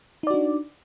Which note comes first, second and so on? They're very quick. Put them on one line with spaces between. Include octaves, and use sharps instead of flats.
D#4 D5 F#4 D4